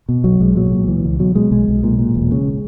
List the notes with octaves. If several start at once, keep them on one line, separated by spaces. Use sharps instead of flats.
B2
B1 F#3
B1 G#3
A#2 F#3
A#2
C#2 E3
C#2
B2 F#3
B2 G#3
B1 G#3
B1
A#2
A#2
E1
C#3